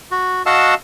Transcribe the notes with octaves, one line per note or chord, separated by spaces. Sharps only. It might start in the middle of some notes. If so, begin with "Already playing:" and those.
F#4
F#4 D#5 F5 F#5 A5 E6